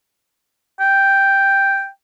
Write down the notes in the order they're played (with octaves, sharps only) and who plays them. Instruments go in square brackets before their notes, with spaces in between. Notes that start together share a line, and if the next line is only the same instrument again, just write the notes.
[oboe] G5